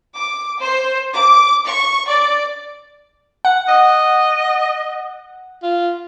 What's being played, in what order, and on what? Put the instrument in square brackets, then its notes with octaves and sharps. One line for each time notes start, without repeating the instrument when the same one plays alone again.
[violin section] D6
C5
D6
C#6
D5
[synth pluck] F#5
[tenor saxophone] D#5
F4